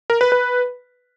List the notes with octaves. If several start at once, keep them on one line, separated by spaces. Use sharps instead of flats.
A#4
B4
B4